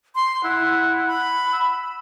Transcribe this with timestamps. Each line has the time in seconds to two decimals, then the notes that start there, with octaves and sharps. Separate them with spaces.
0.15 C6
0.44 E4 F#5
1.07 B5
1.53 E6